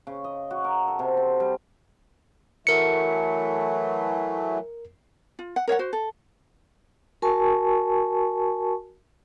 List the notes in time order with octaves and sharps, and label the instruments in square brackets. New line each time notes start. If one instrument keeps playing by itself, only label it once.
[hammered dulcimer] C#3
D#5
F#4
A#4
A4
C3
C4
G3
[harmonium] E3 F#3 A3 [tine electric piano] A#4 C#7
[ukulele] F4
F#5
A#4 C#5 F5 F#5
F#4 C5
A4
[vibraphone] F#4 A#4 G#5 A5 C#6